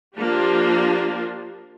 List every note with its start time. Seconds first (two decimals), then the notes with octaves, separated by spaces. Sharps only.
0.16 F3 A#3 D4 F4 G4